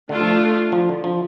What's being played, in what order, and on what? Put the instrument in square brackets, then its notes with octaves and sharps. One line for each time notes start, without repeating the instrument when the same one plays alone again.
[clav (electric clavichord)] D3 [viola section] A3 D4 F4
[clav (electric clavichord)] F3
F3
D3
F3